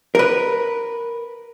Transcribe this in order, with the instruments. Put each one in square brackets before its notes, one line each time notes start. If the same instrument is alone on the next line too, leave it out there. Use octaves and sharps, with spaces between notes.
[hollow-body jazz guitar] A#4 B4